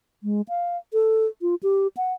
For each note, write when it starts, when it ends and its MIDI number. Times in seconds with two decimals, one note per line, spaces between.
0.23 0.42 56
0.49 0.77 77
0.93 1.26 69
1.42 1.55 65
1.63 1.87 67
1.97 2.13 78